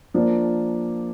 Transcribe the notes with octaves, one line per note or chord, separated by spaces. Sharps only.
F3 A#3 D4